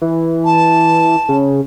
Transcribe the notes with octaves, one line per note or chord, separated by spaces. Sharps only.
E3
A5
C#3